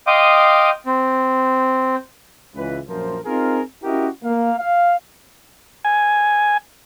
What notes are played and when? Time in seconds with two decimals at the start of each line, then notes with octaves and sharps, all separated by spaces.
0.07 D#5 F5 G5 C6 D6 D#6
0.86 C4
2.54 C#2 E3 B4
2.87 A#1 F#2 F3 A#4 C5
3.24 C4 D#4 F4 G#4 A#4
3.83 C#4 E4 F#4 G4 A#4 D#5
4.23 A#3 F5
4.57 F5
5.85 G#5